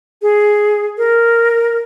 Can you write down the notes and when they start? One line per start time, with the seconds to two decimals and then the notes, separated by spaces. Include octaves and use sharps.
0.22 G#4
0.98 A#4